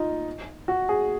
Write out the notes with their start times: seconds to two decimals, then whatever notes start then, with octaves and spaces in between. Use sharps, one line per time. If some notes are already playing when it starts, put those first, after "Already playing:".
Already playing: D#4 F4
0.68 F#4
0.89 G#4